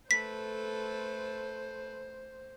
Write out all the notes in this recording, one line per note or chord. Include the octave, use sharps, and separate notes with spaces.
A3 A4 B4 C5 B6